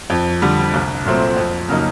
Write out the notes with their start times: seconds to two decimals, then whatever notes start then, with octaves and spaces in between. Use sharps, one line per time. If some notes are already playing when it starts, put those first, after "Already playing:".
0.10 F2
0.42 D3 G3
0.74 C2
1.05 A#2 F#3 A3 C4
1.37 F2
1.69 C#3 F#3 A#3 D#4